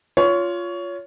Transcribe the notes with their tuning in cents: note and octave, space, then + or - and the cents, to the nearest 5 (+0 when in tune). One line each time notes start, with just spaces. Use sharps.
F4 +0 C#5 +20